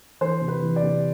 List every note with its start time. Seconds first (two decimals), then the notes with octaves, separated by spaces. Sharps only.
0.21 E3 C5
0.41 C3
0.48 B4
0.62 E3
0.76 D5
0.83 C3